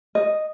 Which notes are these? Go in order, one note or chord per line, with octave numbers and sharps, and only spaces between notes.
D#5